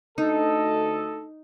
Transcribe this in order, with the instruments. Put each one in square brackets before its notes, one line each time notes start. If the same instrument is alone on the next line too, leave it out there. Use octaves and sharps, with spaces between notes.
[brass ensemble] D2 A4 D#5 [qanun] D#4